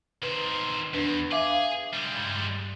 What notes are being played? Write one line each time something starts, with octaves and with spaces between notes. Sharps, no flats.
D#3 B4 C5
E2 D4 B4
G#4 E5 F5 D6
G3 G#3
G2